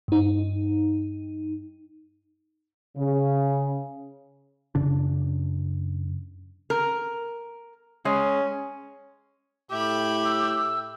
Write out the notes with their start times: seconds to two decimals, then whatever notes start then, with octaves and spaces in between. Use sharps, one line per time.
0.08 G2 D#4
2.97 C#3
4.75 F#2 C#3 D4
6.70 A#4
8.05 G#3 C#4
9.71 A2 G4 E5 B5
10.25 E6